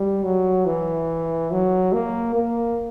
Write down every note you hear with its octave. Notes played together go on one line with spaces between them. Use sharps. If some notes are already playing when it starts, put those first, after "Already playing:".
Already playing: G3
F#3
E3
F#3
A#3
A#3